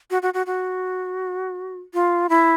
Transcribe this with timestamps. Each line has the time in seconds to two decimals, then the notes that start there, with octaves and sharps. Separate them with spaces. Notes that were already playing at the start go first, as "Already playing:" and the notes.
0.11 F#4
0.22 F#4
0.34 F#4
0.46 F#4
1.94 F4
2.29 E4